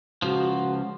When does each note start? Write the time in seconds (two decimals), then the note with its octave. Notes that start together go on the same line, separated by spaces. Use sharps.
0.22 C#2 F3 F#4